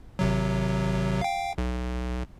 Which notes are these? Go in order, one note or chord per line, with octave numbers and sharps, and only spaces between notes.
G#1 C3 F#3
F5 G5
B1